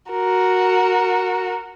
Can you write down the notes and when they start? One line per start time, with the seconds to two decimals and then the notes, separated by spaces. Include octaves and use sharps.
0.12 F#4 A#4